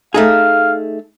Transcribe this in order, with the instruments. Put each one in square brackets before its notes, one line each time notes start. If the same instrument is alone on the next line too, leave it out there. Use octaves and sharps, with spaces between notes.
[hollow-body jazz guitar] A3 D#4 G#4 [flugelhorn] F5